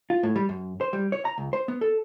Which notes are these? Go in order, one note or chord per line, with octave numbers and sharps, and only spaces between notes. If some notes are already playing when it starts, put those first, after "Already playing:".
F4
A2
G3
F#2
C5
G3
C#5
A#5
C#2
C5
B3
A4